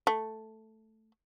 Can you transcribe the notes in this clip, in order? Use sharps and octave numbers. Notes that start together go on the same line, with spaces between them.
A3